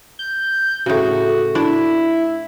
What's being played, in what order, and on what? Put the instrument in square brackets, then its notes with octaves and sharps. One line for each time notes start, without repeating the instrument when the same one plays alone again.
[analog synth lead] G6
[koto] A2 C#3 [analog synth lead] F#4
[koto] D4 [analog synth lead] E4